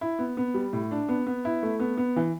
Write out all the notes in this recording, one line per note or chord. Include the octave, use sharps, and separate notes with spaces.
E4
B3
B3
G3
A2
D4
B3
B3
E4
A3
B3
B3
E3